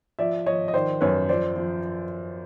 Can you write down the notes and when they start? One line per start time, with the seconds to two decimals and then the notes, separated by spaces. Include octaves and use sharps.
0.19 F3 D5 E5
0.46 F3 C#5 D#5
0.68 D#5
0.73 D#3 C5 D5
1.01 F#2 B4 C#5
1.29 F3 C5 D5
1.56 F3